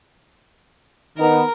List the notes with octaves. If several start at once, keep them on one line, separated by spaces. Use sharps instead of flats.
D#3 B3 D#4 A#4